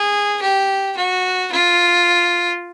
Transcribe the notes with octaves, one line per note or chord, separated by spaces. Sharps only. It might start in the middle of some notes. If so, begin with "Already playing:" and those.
Already playing: G#4
G4
F#4
F4